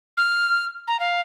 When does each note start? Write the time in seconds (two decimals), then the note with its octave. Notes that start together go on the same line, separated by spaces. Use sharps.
0.17 F6
0.87 A#5
1.00 F5